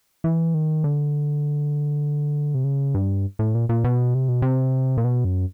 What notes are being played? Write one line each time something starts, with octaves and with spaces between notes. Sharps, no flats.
E3
D#3
D3
C3
C#3
G2
A2
A#2
A#2
B2
C3
B2
C3
A#2
B2
F#2